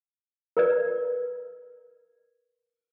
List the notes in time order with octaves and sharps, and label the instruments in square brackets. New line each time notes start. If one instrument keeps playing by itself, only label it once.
[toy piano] A#4 B4 D5